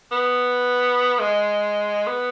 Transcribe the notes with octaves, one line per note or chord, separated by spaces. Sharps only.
B3
G#3
B3